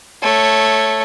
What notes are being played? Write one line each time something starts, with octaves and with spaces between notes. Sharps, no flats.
A3 C#5